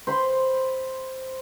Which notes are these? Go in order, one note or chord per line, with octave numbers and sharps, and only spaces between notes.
C5 B5 C6